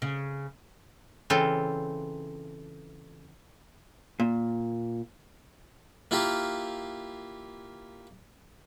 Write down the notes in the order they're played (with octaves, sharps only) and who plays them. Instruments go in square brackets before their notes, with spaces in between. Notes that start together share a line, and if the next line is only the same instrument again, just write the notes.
[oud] C#3
[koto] C#3 E3 C4 F4 A4
[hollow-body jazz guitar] A#2
[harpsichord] A#3 E4 F4 G4 A#4